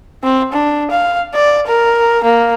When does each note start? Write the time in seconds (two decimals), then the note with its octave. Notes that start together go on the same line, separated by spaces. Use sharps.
0.23 C4
0.53 D4
0.91 F5
1.34 D5
1.67 A#4
2.24 A#3